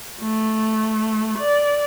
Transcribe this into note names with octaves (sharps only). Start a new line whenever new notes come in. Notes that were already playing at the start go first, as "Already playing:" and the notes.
A3
D5